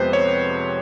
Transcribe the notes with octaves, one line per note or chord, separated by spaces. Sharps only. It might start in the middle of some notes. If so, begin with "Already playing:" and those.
Already playing: F2 C3 F3 G#3 B3 B4 C5
C#5